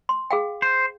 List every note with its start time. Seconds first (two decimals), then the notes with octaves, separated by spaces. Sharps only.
0.09 C6
0.31 G#4 F5 G5
0.62 C5